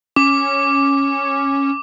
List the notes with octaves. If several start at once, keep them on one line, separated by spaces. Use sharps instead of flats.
C#4 D6